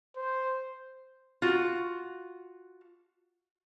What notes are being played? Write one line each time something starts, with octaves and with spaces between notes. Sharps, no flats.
C5
F4 F#4